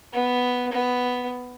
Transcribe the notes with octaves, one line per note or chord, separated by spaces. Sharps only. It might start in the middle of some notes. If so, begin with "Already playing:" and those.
B3
B3